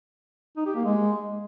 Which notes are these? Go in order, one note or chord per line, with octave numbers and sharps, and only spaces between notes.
D#4
G4
A#3
G#3